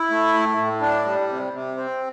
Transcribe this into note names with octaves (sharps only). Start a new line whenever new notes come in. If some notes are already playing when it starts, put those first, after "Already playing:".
Already playing: E4
A3
A2
A2
D4
G3
C3
C3
C4